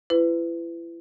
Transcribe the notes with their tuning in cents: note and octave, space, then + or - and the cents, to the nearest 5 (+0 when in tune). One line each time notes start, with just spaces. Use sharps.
E4 +35 B4 +30